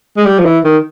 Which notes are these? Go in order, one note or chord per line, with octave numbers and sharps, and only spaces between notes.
G#3
G3
F3
E3
D#3